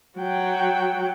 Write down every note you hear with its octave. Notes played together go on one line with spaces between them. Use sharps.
F#3 G5